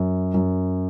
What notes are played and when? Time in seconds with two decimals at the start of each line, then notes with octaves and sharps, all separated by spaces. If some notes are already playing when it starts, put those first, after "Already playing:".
Already playing: F#2
0.34 F#2